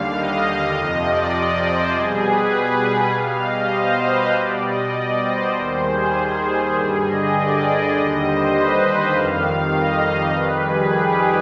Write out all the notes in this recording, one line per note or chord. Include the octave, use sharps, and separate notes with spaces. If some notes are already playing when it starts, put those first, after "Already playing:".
Already playing: D#2 D3 G3 F5
D#5
F2 C3 F3
D5
C5
B2 G3 G#4
B4
G#4
B2 G3 F5
D#5
C5
B4
B2 G3 D5
D#5
D5
C5
D#2 D#3 G3
G#4
G#4
G2 D3 G3
D#5
D5
D#5
D#2 D3 G3
C5
B4
F2 D#3 G3 F5
D#5
F2 D#3 G3 B4
G#4
G4